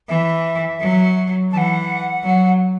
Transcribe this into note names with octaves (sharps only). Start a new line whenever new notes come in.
E3 E5
F#3
E3 F#5 A5
F#3